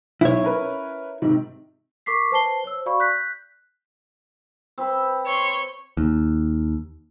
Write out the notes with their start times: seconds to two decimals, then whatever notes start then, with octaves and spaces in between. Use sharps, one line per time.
0.21 B1 E4 C#5
0.43 C#4 A#4 B4
1.22 G#2 C3 D#3
2.06 A#4 C#6 D6 B6 C7
2.31 B4 C5 A5 C7 G7
2.64 C5 C#5 E6
2.86 F#4 D5 F5 B5 C#6
3.00 F#6 G6 B6
4.78 C4 B4
5.26 C#5 C6
5.97 D#2